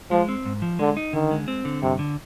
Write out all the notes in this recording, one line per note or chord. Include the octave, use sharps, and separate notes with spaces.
F3 G#3
C4
G#2
F3
D3 G#3
D#4
D3 D#3
G#3
C4
D3
G2 C3
D3